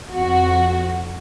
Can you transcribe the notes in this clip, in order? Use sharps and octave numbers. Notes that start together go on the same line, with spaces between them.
F2 F#4